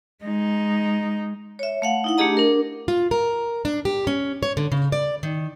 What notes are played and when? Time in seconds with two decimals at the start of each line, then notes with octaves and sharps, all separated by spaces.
0.23 G#3 D#4
1.59 C#5 E5
1.82 A3 F5 F#5
2.04 D#4 E4 F#5
2.18 A3 D4 G4 G#4 D#5 A#5
2.37 D4 A#4
2.88 F4
3.11 A#4
3.65 D4
3.85 G4
4.07 C#4
4.43 C#5
4.57 D3
4.72 C#3
4.92 D5
5.23 D#3